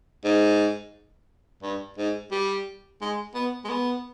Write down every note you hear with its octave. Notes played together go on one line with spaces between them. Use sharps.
G#2
G2
G#2
G3
G#3
B3
G#3
B3